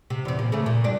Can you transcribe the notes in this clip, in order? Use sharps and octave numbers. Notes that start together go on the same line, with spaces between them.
C3
E2 C3
A#2
C#3 A3
A#2
G2 D4